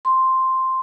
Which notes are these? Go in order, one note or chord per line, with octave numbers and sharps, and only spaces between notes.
C6